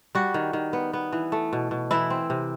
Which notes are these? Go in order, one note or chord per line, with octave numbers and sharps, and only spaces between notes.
G3 F#4
D#3
D#3
B3
B3
E3
A3
B2
B2
E3 E4
C4
C3